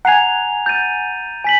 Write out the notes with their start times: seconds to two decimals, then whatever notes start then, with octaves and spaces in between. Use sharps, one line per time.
0.05 F#5 G#5 A#5 C7 F7
0.66 G6 A6 D#7
1.44 G#5 B6 F#7